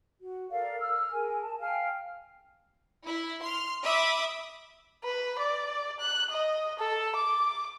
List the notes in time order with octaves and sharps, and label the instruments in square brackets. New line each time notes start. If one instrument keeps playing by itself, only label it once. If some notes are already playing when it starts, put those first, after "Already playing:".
[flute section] F#4
A4 A#4 D5 F5
E6 F6
G#4 A#4 G#5
A5
F5 G5 G#5 F6
[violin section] E4
C6 F6
E5 B5 D6 D#6
[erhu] B4
D5
F#6
D#5
A4
D6